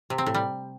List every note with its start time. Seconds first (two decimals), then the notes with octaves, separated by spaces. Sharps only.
0.10 C3
0.18 C4
0.26 A2
0.35 G3